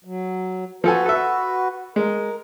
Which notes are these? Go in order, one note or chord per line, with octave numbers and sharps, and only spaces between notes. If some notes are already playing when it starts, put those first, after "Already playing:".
F#3
F3 F#4 A4 B4 G#5
A4 E5
G#3 A#4